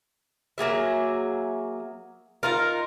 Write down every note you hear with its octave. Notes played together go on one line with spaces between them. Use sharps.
F#3 A#3 G#4 E5
D#4 F4 A#4